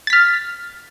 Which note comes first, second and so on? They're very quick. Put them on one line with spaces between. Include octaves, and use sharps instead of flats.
A6 B6 F6